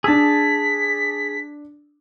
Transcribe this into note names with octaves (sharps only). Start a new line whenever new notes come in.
D4 G#4 A5 E6 B6